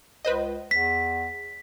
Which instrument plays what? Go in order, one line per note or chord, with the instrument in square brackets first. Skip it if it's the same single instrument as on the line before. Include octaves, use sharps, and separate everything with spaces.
[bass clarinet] C#2 [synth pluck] B4 C5 D#5
[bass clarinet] E2 [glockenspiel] B6